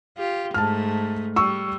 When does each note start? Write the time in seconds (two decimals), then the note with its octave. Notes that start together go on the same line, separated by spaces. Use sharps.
0.18 F4 G4
0.54 G#2 A3 A5 F6
1.36 G3 C#6 E6